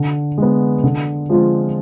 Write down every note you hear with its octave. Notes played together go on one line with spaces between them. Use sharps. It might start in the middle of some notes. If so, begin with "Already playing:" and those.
Already playing: D3
G#3 B3
D3
F3 G#3 C4 F4